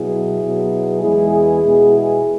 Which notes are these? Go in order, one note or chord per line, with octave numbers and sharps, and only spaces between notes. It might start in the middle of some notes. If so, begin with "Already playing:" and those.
Already playing: B2 F#3 B3 E4 G#4
B2 F#3 B3
E2 E3 G#3 B3 E4 G#4
B2 G#3 B3